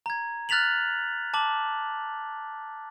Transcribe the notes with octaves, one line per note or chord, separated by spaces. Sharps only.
A#5 G#6
F6 F#6 A6 B6 F7 F#7
A5 D6 F#7